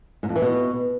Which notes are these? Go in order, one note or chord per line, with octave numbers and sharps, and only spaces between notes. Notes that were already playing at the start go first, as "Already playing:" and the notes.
G#2
F2
E3
B2